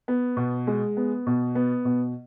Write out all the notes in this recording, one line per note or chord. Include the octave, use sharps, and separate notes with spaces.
B3
B2
G#3
B3
B2
B3
B2